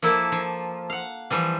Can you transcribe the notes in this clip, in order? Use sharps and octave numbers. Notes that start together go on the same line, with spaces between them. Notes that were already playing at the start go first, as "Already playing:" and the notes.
F3 A#3 E4 A4 D5
F3
F5 F#5
E3 F3 G3